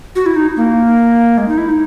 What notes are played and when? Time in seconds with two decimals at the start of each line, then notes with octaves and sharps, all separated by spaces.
0.16 F#4
0.26 E4
0.36 D#4
0.57 A#3
1.38 G#3
1.48 D#4
1.58 E4
1.69 D#4